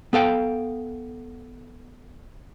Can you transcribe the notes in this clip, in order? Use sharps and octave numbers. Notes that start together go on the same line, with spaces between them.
B3 A4 F5 G5